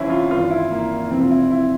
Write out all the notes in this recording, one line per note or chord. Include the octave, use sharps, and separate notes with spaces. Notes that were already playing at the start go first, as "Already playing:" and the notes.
Already playing: C2 C3 E3 C4 C#4 E4
F4
G#1 G2 E3 F4
E4
A#3
F1 F2 C3 E3 C4
F4
E4
E4